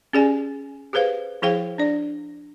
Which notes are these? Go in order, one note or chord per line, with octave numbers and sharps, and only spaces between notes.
C#4 G4 G#4 D5 G#5
G4 G#4 B4 C5 F5
F3 E4 G#4 C5 F5 G5
D4 D5